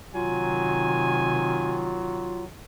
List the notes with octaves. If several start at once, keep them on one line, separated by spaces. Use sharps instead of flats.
C3 D#3 F#3 F4 G#5